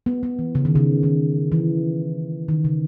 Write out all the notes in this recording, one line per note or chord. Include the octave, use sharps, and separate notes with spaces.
B3
B3
E3
C#3
D#3
C#3
D#3
E3
D#3
C#3